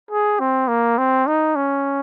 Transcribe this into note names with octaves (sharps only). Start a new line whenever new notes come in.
G#4
C4
A#3
C4
D#4
C#4